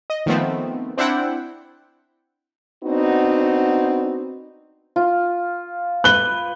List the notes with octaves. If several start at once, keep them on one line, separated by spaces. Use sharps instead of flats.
D#5
D#3 F3 A3 B3 C4
C4 D4 E4 F#5 G5
B3 C4 D4 D#4 F#4
F4
B4 F#6 G7